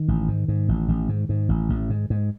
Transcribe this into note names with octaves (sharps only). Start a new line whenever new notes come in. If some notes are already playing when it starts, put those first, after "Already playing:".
Already playing: D#3
A1
G#2
G#2
A1
A1
G#2
G#2
A1
A1
G#2
G#2